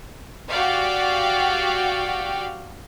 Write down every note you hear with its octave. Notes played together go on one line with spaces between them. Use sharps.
F#4 G4 D5 F5 G5